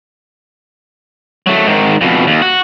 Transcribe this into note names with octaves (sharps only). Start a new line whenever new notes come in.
F#3 A3
G#2 D#3
F2 B2
D#2
F#4